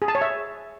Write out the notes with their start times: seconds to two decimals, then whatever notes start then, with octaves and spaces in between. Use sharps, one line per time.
0.02 G#4
0.08 A5
0.15 C#5
0.21 E5